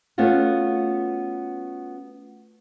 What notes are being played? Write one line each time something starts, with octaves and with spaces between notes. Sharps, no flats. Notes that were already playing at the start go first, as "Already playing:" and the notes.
A3 B3 C#4 F4 F#4